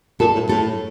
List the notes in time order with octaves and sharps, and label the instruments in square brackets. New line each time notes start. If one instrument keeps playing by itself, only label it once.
[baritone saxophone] A#2 [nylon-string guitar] A4
[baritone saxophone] A2
[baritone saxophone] A2 [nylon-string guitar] A4